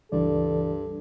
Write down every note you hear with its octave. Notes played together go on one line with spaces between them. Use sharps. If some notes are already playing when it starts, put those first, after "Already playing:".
C#2 G2 E3 A4 D5